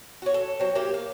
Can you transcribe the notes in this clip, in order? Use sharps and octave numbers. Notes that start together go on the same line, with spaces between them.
F#4 C#5
A4
F#3 C4
A#3 E4 G4 G5
F5